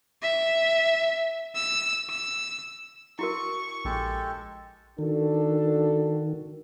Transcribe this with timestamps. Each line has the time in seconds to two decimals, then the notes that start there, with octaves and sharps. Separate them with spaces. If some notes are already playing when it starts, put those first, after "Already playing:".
0.22 E5
1.55 E6
2.10 E6
3.19 E4 F#4 A#4 C#6
3.85 A#1 G#3 G4 A4
4.98 D#3 D4 F#4 A4